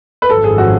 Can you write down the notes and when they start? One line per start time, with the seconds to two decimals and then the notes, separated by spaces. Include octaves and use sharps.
0.22 B4
0.29 G#1 F#2 F3 A4
0.44 G#4
0.58 F#4